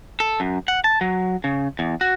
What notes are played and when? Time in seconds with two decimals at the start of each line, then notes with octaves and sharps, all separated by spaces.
0.20 A4
0.40 F#2
0.68 F#5
0.84 A5
1.01 F#3
1.44 C#3
1.79 E2
2.01 F#4